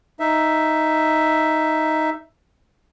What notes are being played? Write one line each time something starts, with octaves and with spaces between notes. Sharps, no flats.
D#4 E5